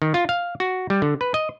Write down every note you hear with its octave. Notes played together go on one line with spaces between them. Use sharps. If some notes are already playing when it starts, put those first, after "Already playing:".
D#3
F4
F5
F#4
G3
D3
B4
D#5